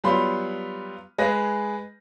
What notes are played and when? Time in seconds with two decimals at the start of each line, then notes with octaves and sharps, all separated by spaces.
0.04 F#3 G3 B3 F4 B5 C6
1.18 G#3 G#4 B4 A#6